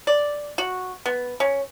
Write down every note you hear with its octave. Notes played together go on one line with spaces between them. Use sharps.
D5
F#4
B3
C#4